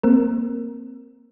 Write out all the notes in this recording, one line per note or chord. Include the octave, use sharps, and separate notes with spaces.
A#3 C4 A#4